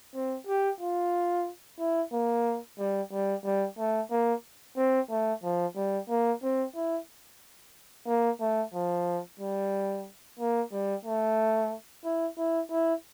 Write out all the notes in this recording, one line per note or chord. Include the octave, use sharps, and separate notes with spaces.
C4
G4
F4
E4
A#3
G3
G3
G3
A3
A#3
C4
A3
F3
G3
A#3
C4
E4
A#3
A3
F3
G3
A#3
G3
A3
E4
E4
E4